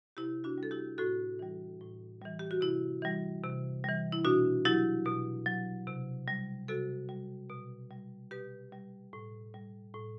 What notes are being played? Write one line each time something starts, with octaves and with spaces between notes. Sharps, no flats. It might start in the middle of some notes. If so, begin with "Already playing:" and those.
C3 E4 G4
D4 F#4
G3
A4
E4 G4
A2 F#4 A4
E3 G3
A2
E3 G3
G4
F#4
C3 E4
E3 G3
C3
E3 G3
E4
B2 D4 F#4
F#3 E4 G4
B2
F#3
C3
G3
C3 F#4 A4
G3
B2
G3
B2 G4 B4
G3
A2
G3
A2